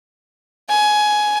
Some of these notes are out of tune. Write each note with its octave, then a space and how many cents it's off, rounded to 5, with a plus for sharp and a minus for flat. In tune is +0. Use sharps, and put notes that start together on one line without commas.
G#5 +15